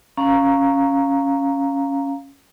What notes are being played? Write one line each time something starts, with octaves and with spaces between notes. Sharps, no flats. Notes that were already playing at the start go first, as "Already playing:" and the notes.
C#4 F5 A#5